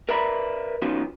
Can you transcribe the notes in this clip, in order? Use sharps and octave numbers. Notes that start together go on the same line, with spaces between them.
A#4 B4 D5 E5 A#5 B5
F3 B3 C#4 D#4 F4 F#4